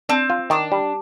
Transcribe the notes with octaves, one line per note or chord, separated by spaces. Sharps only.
C4 D4
F4
D#3 D4
G3